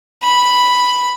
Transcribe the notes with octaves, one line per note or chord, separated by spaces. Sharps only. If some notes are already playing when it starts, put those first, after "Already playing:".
B5